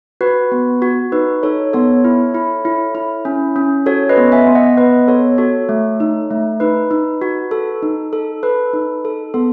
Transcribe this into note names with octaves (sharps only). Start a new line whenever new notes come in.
F#4 B4
B3
F#4
D#4 B4
D#4 A4 C#5
B3 A4 C#5
E4
E4
E4
E4
C#4
C#4
F#4 A4 C#5
B4 D#5
B3
E5 G#5
B3
D#5 F#5
B3 B4 D#5
B3 A4 C#5
F#4 A4 C#5
A3
D#4
A3
D#4 B4
D#4
F#4
A4
D#4
A4
A4 B4
D#4
A4
B3 A4